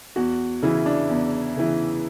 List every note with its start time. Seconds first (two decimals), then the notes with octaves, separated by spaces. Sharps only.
0.16 E2 F#4
0.63 C#3 E3 E4
0.86 D4
1.09 E2
1.57 C#3 E3